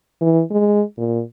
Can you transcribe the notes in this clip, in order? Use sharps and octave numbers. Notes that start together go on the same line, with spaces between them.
E3
G#3
A#2